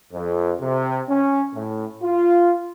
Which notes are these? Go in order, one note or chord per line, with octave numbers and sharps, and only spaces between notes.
F2
C3
C#4
A2
F4